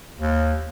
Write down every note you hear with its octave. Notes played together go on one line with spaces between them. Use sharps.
D#2